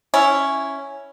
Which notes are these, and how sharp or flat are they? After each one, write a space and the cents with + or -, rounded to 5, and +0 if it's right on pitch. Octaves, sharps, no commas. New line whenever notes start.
C#4 +0 E4 +0